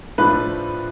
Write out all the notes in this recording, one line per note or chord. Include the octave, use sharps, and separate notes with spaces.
A2 F3 A3 D4 F4 B4 B5